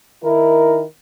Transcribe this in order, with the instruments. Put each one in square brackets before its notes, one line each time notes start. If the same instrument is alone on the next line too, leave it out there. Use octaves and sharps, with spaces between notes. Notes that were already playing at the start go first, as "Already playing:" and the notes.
[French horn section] D#3 D#4 E4 A#4